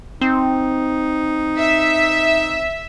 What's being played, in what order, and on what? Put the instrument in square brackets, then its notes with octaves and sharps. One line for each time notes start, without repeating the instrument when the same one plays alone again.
[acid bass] C4 [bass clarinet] D#4
[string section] E5